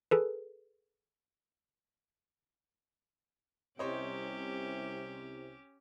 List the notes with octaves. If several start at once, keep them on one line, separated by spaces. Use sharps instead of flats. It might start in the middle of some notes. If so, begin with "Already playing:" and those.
G#4 A4 B4
C2 C3 C#4 G4 C5 C#5 D#5